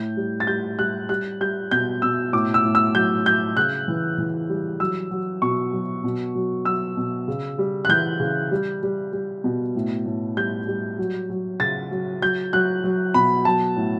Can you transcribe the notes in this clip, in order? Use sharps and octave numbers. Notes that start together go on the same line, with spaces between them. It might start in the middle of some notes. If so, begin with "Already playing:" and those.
Already playing: A2 G6
G3
A6
G3 G6
G3 F#6
G3 F#6
G3 G6
B2 G6
B2 E6
A2 D6
E6
A2
E6
F#3 G6
F#3 G6
C#3 F#6
E3
E3
G3
F#3 E6
F#3
B2 C#6
F#3
B2
F#3
F#3 E6
B2
C#3
G3
F#6
E3 G6
C#3
G3
G3
G3
B2
A2
A2
G3 G6
G3
F#3
F#3
C#3 A6
F#3
F#3 G6
F#3 F#6
F#3
B2 B5
F#3 A5
A2